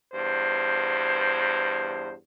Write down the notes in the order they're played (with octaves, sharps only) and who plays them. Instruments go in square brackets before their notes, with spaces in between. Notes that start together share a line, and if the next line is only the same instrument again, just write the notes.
[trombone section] E2 G2 C5